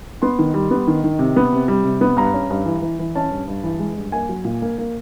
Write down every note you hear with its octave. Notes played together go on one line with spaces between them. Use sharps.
B3 C6
D#3
G3
B3
D#3
D#3
C3
B3
C3
G3
C3
B3
G2 A#5
C#4
G2
E3
E3
E3
C#4 A5
G2
G2
E3
G#3
G2
A#3 G#5
F#3
A#2
A#3
A#3